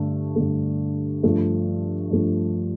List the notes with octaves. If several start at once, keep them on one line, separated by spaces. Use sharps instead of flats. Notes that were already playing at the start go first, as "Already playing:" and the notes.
Already playing: G2 D3 A3
G2 D3 A3
G2 F3 A3
G2 F3 A3